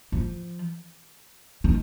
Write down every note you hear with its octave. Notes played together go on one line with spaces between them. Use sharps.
F3
D#3